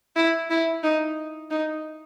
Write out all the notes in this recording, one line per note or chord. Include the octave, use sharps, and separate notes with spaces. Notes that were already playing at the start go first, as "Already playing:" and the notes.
E4
E4
D#4
D#4